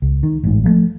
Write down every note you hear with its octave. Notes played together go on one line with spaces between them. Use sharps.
C#2
D#3
A1 G#2
F3 G3 A3